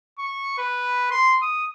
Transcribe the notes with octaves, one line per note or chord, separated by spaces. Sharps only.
C#6
B4
C6
D#6